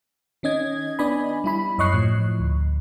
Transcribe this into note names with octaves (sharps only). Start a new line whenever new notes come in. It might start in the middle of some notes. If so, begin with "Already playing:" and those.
D#3 C#4 D#5 G#6
B3 D4 D5 D#5 G#5 B5
G3 E4 B5
F#2 C#5 D#5 C#6 F#6 C7
A2 F3
D2